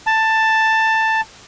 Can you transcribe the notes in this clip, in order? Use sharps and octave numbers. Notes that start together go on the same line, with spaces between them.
A5